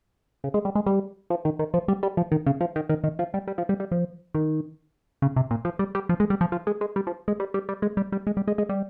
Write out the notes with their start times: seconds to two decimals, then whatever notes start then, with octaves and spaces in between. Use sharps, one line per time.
0.44 C#3
0.54 G#3
0.65 G3
0.75 G#3
0.86 G3
1.30 F3
1.45 D#3
1.59 D#3
1.74 F3
1.88 G3
2.03 G3
2.17 F3
2.32 D#3
2.46 C#3
2.61 F3
2.76 D#3
2.89 D#3
3.04 D#3
3.19 F3
3.34 G3
3.47 G3
3.58 F3
3.69 G3
3.80 G3
3.92 F3
4.35 D#3
5.22 C#3
5.36 C3
5.51 A#2
5.65 F3
5.79 G3
5.95 G3
6.09 F3
6.20 G#3
6.30 G3
6.41 F3
6.52 F3
6.67 G#3
6.81 G#3
6.96 G3
7.07 F3
7.28 G#3
7.40 G3
7.54 G3
7.69 G3
7.82 G#3
7.97 G3
8.12 G3
8.27 G#3
8.37 G3
8.48 G#3
8.58 G#3
8.69 G3